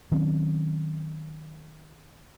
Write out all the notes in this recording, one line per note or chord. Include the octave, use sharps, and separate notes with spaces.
D#3 F#3 C4 C#4